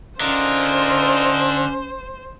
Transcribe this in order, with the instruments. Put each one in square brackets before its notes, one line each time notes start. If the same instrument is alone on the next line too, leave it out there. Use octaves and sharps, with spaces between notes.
[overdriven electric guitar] D3 [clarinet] C#4 [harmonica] D#4 F4 A#4 [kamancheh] C5